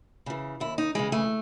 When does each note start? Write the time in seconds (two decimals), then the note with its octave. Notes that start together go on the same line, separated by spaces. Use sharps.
0.26 C#3 E3
0.60 D#2 E4
0.78 D#4
0.95 C#3 E3 G#3
1.12 A3